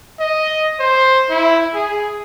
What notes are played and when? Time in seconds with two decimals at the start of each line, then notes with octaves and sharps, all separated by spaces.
0.20 D#5
0.80 C5
1.30 E4
1.75 G#4